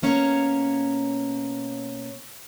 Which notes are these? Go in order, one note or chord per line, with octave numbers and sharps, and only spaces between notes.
B2 A#3 C#4 C#5 A#5